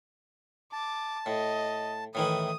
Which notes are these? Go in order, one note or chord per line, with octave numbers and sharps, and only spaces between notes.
A5 D6
A2 D#5
A2 D#3 E3 D#6